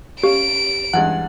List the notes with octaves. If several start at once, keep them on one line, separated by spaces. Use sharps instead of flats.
C#4 G4 F5 D7
E2 G2 G#3 F#5